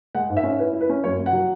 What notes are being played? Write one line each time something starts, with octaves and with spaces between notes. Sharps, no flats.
G#3 F#5
G#2
E5
C#4
E4 B4
E4
B4
C#4
F#2 C#5
F#2
F#5
F#3